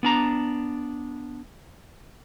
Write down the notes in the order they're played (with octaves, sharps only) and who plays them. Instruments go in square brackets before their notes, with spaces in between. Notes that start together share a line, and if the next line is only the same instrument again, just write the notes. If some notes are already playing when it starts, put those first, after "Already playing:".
[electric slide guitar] B3 D4 A#5